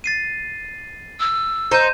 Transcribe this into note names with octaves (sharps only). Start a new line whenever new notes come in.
A6 C7 D#7
E6
D#4 C5 G6 D#7 E7